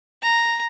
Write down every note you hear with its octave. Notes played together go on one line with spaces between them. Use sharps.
A#5